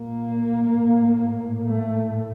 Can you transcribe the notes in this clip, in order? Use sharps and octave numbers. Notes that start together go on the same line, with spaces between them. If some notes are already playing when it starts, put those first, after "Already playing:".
Already playing: A#2 A#3
A2
A2 A3